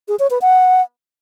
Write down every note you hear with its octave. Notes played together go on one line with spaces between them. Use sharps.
G#4
C#5
B4
F#5